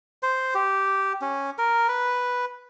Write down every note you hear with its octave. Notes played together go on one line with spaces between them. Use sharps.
C5
G4
C#4
A#4
B4